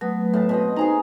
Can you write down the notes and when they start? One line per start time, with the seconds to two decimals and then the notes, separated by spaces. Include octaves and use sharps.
0.01 F#3 A3 B3
0.34 A2 A5
0.49 B2 C4 D#5
0.76 D#4 G#4 C5 G#5 A#5